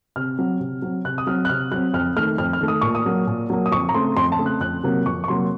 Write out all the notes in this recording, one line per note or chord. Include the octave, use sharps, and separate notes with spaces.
C3 F6
F#3 C4
C3
F#3 C4
C3 F#6
D#6
F#3 C4 F6
F#6
C3 F6
F#3 C4 F#6
F2 F6
D#3 A3 F6
F2 F6
F6
D#3 A3
D#6
A#2 C#6
D#6
F#3 A#3
A#2
F#3 A#3
D#6
F2 C#6
A#5
C#3 A3 C4 C6
F2 C6
A5
C#3 A3 C4
F#6
F2 F#6
C3 F#3 A#3
F2 C#6
C#6
C3 F#3 A#3 C6